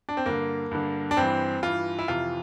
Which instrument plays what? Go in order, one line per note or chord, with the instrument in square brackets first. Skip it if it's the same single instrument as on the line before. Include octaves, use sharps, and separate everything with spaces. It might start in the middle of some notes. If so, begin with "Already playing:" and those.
[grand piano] D4
C4
G2 D3 A#3
G2 D3
D4
G2 E3 C4
G2 E3 F4
E4
F2 C3 E3 F4